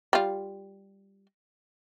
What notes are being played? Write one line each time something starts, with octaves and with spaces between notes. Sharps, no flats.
G3 F4